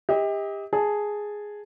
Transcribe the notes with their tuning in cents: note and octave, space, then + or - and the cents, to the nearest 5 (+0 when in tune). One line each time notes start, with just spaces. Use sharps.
G4 +30 D#5 +40
G#4 +0 A5 +0